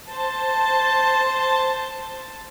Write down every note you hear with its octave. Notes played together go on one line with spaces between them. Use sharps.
C5 A5